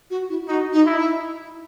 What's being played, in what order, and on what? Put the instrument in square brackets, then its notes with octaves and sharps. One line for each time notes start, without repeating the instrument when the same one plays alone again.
[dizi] F#4
E4
[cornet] D#4 [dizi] F#4
[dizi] D#4
[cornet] E4
[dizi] E4